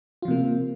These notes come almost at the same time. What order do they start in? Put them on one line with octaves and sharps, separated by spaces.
F4 F3 C3 A#3